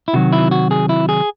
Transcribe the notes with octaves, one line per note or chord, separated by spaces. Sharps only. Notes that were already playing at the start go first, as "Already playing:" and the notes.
E4
C3 D#3 F#3 F#4
E4
F#4
G#4
E4
G#4